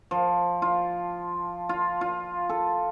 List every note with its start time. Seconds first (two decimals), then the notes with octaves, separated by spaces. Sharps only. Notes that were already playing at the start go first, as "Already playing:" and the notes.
0.11 F3
0.62 F4
1.69 F4
2.01 F4
2.49 A4